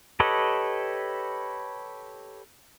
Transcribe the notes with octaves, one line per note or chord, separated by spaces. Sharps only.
G4 A4 B4 C#5 D#5